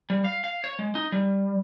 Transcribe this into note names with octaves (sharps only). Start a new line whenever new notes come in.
G3
F5
F5
C#5
G#3
D#4
G3